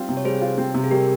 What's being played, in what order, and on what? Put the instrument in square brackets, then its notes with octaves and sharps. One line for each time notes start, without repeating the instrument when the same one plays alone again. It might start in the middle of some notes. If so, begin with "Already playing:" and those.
Already playing: [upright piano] G3 C4 F4
C3
[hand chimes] C#5
[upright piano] G3 [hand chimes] G#4 C5
[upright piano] F4
C4
C3
[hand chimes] G#4
[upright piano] G3 [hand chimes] G4 A#4